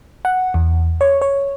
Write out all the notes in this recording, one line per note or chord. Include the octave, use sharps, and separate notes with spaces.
F#5
E2
C#5
C#5